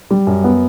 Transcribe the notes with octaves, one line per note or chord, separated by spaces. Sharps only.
G3
F#2
B3